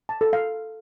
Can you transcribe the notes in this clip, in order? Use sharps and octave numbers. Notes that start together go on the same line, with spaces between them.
A5
A4
F5